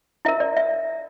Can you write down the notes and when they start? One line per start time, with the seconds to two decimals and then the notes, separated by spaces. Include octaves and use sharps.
0.25 E4 A#4 E5
0.40 D5
0.57 E5